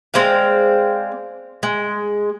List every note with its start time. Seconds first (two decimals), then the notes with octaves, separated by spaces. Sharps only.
0.14 G#3 C4 D5 F5
1.63 G#3